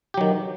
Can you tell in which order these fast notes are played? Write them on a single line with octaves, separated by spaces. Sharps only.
G4 F#3 D#3